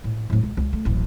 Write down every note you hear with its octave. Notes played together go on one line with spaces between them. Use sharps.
A2
D1 A2
C#2
C#2
A3
D1 A1